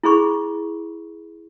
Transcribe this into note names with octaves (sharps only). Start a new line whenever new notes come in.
E4 G#4 B5 C#6